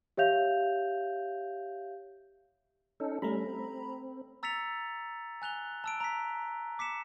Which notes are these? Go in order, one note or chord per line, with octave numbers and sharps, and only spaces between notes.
G4 C#5 E5 F5 G6 F7
C#4 D#4 A4
G3 A3 C#4 A#5 B5
C4
A#5 E6 A6 B6 C#7 F7
G#5 F#6 F7 G7
A5 E6 D7
A#5 B6
D6 B6 C#7 E7